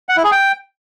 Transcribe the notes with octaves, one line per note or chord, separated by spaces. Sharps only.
F#5
E4
G#4
G5